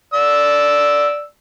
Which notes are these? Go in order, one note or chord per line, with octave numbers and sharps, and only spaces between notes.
D5 E6